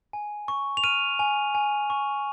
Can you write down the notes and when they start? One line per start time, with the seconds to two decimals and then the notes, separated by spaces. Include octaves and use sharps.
0.13 G#5
0.48 C#6
0.77 F7
0.84 F6 D#7
1.19 G#5
1.55 G#5
1.90 C#6